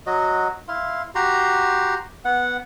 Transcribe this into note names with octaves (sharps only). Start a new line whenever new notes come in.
F#3 F#4 D#5
E4 F5 C6
F#4 G4 A#5 C6
B3 F#5